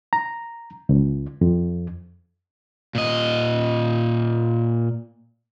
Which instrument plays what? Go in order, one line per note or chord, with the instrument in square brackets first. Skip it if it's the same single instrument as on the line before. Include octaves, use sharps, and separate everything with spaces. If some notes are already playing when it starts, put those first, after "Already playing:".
[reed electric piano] A#5
C#2
F2
[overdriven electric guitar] A#2 D#5